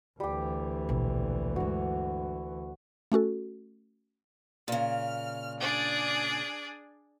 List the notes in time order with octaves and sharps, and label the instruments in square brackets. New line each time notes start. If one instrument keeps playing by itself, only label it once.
[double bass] D2 E3 [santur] G3 G4
[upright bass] A#1 B2
[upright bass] G2 G#3 [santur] F#4
[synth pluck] A3 C#4 F#4 A4
[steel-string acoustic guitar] A#2 C#3 [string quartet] F6
[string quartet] D4 G#4 D5